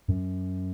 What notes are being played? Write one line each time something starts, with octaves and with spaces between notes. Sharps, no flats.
F#2